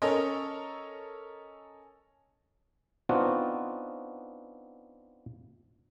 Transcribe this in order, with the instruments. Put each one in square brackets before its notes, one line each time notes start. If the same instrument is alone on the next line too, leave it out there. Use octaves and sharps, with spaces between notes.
[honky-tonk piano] C#4 A4 A#4 C#5 D#5
[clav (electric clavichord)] B3 C4 D4 D#4 F4 F#4